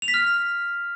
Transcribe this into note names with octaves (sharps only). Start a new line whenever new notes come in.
F7
B6
F6